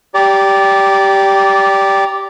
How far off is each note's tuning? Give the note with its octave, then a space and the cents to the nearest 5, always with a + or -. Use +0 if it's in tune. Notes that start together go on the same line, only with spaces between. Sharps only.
G4 +0 D5 -20 A#5 +0